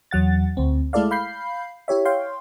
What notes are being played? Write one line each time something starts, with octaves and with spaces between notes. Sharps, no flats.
E2 F#3 F#5 A6
D2 C4
G#3 A3 E4 A4 D5 F5
F5 B5 G6 C7
E4 G4 C#5 E5
C#5 F5 G5 C6